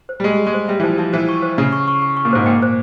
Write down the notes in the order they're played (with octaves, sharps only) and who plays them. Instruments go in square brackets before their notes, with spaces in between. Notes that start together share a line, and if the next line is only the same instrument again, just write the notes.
[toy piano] C5
[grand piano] G3
[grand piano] G#3 [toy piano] G#4
[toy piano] G#4
[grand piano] G#3
[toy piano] C5
[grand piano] G3 [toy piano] E5
[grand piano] E3
[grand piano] F3 [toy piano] C5
[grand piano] F3 [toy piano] E5
[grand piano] E3 [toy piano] C5
[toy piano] C#6
C5
[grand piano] C#3 [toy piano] E5
[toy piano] C#6
C#6
C#6
C#6
[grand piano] A#2
[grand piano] G#2 [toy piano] C5
[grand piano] A#2 [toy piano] G5
[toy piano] C5